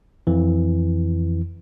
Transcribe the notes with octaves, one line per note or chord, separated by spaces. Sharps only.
F2 E3